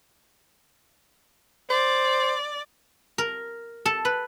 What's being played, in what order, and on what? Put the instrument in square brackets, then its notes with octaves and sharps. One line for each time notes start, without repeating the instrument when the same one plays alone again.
[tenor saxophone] C5 [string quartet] D5
[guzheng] A#4
A4
B4